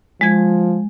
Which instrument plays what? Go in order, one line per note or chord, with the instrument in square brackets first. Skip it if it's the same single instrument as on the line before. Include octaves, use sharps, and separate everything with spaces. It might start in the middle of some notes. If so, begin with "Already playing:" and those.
[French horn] F3 [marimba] G#3 G#6